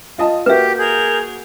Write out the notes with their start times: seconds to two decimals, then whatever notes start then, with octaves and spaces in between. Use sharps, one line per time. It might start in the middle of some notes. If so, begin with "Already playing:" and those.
0.18 F4 D#5 A5
0.46 A#3 F#4 G4 B4 E5
0.77 G#4 A#4 G6